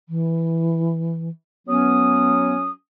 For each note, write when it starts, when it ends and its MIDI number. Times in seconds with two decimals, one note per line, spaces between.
0.09 1.29 52
1.67 2.69 54
1.67 2.55 59
1.67 2.69 61
1.67 2.69 87